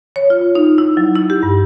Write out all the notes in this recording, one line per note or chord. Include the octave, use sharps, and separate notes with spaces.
C#5
F4
D#4
E4
F#3
E4
G4
G2